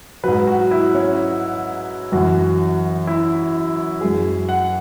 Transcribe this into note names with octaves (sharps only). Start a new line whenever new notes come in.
G#2 F#3 B4
F#4
E4
C#4
F#2 E3 F#4
E4
F#2 F#3 G#4
F#5